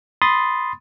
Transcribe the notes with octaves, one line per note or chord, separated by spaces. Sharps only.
B5 C6 D#6 A6